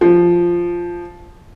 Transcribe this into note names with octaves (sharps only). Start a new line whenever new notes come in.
F3